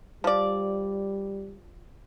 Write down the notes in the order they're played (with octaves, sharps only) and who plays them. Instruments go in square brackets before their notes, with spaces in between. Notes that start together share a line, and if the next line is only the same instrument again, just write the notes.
[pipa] F3 D5 [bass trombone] G3